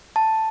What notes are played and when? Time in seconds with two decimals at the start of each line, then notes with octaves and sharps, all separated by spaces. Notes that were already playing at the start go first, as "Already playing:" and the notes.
0.16 A5